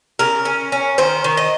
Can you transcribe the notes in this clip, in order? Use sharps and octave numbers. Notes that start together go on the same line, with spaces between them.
C#3 A#4
C#4
C#4
D#3 C5
D#3
D#5